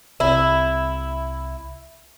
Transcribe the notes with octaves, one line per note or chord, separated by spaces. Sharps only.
C2 C3 E4